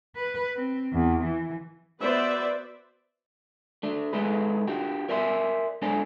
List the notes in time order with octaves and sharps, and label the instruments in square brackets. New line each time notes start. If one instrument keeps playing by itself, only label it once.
[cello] B4
C4
E2
E3
[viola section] B3 F#4 B4 C5 D5 E5
[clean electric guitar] A3 D4
G#3 A3 D#4 G#4 B4
D4 F#4 G4
A#4 D5 E5 G#5 C6
G#2 D4 A4 C5 D5 G#5